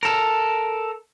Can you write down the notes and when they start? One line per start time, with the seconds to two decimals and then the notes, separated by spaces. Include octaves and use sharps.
0.03 A4 A#4